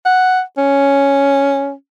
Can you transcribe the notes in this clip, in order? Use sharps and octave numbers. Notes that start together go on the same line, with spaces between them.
F#5
C#4